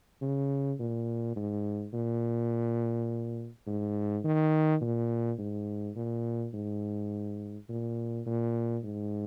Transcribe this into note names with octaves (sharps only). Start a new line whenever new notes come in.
C#3
A#2
G#2
A#2
G#2
D#3
A#2
G#2
A#2
G#2
A#2
A#2
G#2